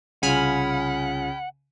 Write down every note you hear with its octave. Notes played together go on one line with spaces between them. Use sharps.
C2 C#3 F4 F#5 G#5 B5 F6